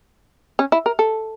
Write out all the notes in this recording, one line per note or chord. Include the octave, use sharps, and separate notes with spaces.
C#4
E4
A#4
A4